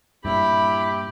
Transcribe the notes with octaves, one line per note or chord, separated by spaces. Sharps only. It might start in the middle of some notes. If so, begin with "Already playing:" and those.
G2 A#2 E4 G4 B5